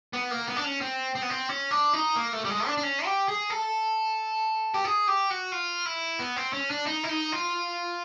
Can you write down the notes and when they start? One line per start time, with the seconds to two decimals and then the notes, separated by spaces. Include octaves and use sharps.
0.13 B3
0.31 A#3
0.47 B3
0.56 D4
0.64 C#4
0.81 C4
1.15 C4
1.22 B3
1.30 C4
1.49 C#4
1.71 D4
1.93 D#4
2.16 A#3
2.33 A3
2.44 G3
2.50 G#3
2.66 D4
2.77 D4
2.83 C#4
3.05 G4
3.28 G#4
3.50 A4
4.74 G4
4.84 G#4
5.08 G4
5.30 F#4
5.52 F4
5.86 E4
6.19 B3
6.36 C4
6.53 C#4
6.70 D4
6.86 D#4
7.04 E4
7.09 D#4
7.32 F4